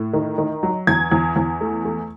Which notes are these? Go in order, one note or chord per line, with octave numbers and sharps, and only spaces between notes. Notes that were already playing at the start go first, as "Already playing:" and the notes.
Already playing: A2
D#3
D#3
F#3
E2 G#6
E2
E2
A3
A3